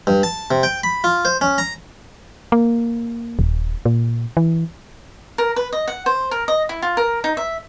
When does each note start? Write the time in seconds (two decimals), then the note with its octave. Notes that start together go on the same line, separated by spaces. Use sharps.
0.07 G2
0.23 A5
0.51 C3
0.63 G5
0.83 B5
1.04 F4
1.25 C5
1.41 C#4
1.58 A#5
2.52 A#3
3.39 D#1
3.85 A#2
4.37 E3
5.38 A#4
5.56 B4
5.73 D#5
5.88 F#5
6.06 C5
6.31 A#4
6.48 D#5
6.69 E4
6.82 F4
6.97 A#4
7.24 D#4
7.37 E5